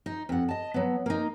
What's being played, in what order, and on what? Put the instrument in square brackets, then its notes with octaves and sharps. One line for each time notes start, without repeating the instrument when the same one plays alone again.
[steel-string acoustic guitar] D#4
F2 F#5
D#5 A5
F#3 B3
A#3 D#4